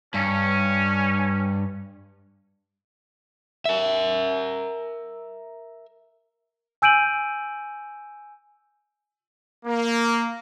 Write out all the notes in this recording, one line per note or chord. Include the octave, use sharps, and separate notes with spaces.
G2 C#4
A#4 E5
G#5 E6 G6 D7 D#7 F#7
A#3